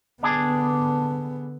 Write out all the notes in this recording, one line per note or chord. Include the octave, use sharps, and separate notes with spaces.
D3 B3 D4 G#4